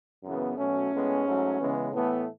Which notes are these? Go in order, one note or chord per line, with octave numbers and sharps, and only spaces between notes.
F#2 C#3 E3 B3
B2 F#3 A3 C#4
A2 G#3 B3
G#2 F#3 A3
C#3 E3 G#3 B3
A2 E3 A3 B3